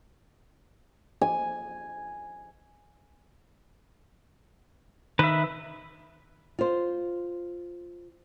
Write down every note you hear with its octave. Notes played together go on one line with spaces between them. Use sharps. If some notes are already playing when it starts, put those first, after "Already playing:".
G#5
D#3 B4 E5
F4 C5